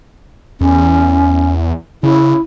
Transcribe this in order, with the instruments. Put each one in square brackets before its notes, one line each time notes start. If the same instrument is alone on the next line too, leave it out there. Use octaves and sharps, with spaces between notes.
[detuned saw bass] E2 [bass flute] C#4
[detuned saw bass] C#3 [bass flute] E4